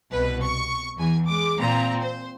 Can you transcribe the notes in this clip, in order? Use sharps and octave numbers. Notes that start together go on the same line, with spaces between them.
C2 B2 B4
C#6
E2 G#5
G#3 D6
A#2 C4 A#5
C5